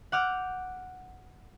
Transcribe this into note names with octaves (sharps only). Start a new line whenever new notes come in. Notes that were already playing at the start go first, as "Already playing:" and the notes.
F#5 D6 F6 G6